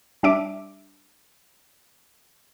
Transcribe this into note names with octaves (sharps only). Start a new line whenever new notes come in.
G3 D4 E5 D6